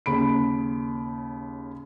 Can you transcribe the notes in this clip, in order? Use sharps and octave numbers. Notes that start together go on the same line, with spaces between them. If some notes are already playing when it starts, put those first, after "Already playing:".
D#2 C#3 B5 D7